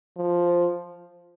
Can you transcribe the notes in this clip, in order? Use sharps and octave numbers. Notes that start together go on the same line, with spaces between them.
F3